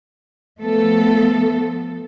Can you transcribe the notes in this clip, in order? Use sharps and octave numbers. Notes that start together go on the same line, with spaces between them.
F3 A3 B3 A4